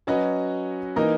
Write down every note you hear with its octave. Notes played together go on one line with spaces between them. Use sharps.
F#3 C#4 F#4 B4 D#5
E3 A#3 D#4 A#4 D#5